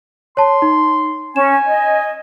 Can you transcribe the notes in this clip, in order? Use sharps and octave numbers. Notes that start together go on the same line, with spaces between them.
C#5 A5 C6
D#4
C#4 G#5 E7
D#5